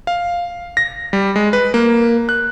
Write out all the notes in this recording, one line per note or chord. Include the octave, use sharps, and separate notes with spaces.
F5
A#6
G3
G#3
B4
A#3
F#6